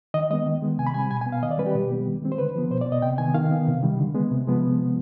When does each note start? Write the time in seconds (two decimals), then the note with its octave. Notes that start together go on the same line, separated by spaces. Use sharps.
0.14 D#3 D#5
0.30 G#3 D#5
0.33 B3
0.46 D#3
0.62 G#3 B3
0.78 C3 G#5
0.87 B5
0.94 G3 C4 G#5
1.10 B2 G#5
1.21 G#5
1.26 B3
1.32 F5
1.42 D#3 D#5
1.51 D5
1.58 G3 C4 B4
1.66 G4
1.75 B2
1.91 G3 B3
2.07 D#3
2.22 G#3 C4
2.32 C5
2.38 D3 B4
2.55 F3 B3
2.71 B2 C5
2.81 D5
2.86 B3
2.92 D#5
3.02 C3 G5
3.18 D#3 B3 G#5
3.35 D#3 F5
3.51 B3
3.67 C3
3.83 D#3 G3
3.99 D3
4.15 G#3 B3
4.31 C3
4.47 F3 G#3 B3